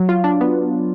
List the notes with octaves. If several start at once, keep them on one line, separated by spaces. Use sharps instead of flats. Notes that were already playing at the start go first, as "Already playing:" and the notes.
Already playing: F#3
F4
D4
B3